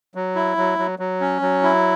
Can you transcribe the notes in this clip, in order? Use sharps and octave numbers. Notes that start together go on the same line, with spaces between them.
F#3
E4
F#3
F#3
F#3
C#4
F#3
E4